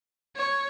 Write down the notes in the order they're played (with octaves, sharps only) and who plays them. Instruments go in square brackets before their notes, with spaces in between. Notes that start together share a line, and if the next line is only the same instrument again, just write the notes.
[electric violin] C#5